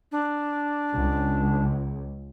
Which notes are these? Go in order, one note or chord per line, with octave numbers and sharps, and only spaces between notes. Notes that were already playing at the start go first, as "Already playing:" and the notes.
D4
C#2